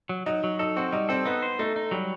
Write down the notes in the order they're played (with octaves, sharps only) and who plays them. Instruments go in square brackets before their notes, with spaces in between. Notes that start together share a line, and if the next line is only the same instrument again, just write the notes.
[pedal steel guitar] F#3
[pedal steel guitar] F#3 [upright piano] D#4
[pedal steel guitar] F#3
[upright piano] D#4 [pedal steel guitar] A4
[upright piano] C4 [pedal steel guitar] F#4
[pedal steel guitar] G3 [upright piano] D#4
[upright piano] C4 [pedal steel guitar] A4
[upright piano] B3 [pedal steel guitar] D#4
[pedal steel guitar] C5
[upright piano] A3 [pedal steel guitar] D#4
[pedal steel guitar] D#4
[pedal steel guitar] F#3 [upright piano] G3